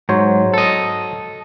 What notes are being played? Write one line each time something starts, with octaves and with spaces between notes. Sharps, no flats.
G#2 F#3 C5 C#5
A4 D#5